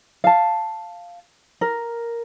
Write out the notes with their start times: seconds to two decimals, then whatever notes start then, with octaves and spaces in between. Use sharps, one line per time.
0.24 F5 A5
1.61 A#4